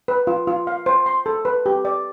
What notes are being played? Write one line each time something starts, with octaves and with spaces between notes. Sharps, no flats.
B4
F4
F4
F5
C5
C6
A4
B4
G4
D5